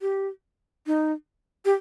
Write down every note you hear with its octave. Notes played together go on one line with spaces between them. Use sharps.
G4
D#4
G4